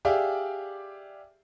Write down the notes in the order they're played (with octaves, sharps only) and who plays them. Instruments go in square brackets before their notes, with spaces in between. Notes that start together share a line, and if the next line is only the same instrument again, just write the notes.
[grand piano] G4 G#4 D5 E5 F5